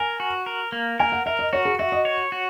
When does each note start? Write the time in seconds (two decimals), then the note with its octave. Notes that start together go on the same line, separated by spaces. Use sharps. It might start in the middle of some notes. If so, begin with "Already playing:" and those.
Already playing: A#4 G#5
0.20 F#4
0.46 A#4
0.72 A#3
0.99 A#4 G#5
1.12 F#5
1.26 A#4 E5
1.39 D#5
1.53 F#4 C#5
1.65 G#4
1.79 F#4 E5
1.92 D#5
2.05 C#5
2.32 F#4